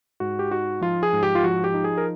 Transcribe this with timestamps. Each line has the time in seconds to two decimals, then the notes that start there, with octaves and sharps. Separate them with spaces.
0.20 G#2 F#4
0.39 G4
0.51 D#4 F#4
0.81 F3 F4
1.03 G#4
1.13 G#2
1.23 G4
1.35 F4
1.43 F3 F#4
1.64 G4
1.74 D#4
1.84 G#4
1.98 A#4